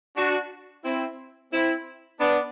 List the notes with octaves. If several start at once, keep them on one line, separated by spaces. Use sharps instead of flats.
D4 F#4
C4 E4
C4 E4
B3 D4